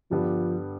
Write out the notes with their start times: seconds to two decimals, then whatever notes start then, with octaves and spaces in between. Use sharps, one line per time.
0.11 G2 D3 F3 G3 B3 D4